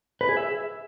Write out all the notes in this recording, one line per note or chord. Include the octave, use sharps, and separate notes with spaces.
B4
G#4
E5